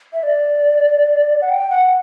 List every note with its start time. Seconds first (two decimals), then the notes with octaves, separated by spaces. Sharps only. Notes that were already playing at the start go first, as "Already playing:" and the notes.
0.13 E5
0.23 D5
1.41 F#5
1.50 G5
1.71 F#5